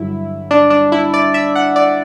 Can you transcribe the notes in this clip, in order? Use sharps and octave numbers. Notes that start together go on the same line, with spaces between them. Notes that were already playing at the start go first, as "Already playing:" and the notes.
Already playing: G2 D3 F#3 E4
D4
D4
E4
D5
E5
F#5
D5